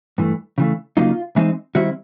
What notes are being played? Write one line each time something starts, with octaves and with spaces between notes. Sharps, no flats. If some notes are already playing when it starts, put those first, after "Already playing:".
G2 E3 A3
C#3 E3 A3
C#3 F#3 A#3 D#4 F4
E3 G#3 C4 D#4
D#3 G3 C4 E4 F#4